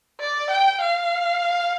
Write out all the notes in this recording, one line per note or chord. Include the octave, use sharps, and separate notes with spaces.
D5
G5
F5